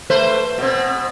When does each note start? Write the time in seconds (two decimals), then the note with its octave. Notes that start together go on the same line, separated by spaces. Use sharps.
0.10 A3 B4 C5
0.58 B2 C4